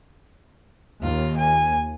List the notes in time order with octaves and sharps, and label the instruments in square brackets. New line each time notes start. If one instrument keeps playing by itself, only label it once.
[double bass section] D#2 [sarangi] F4
[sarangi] G#5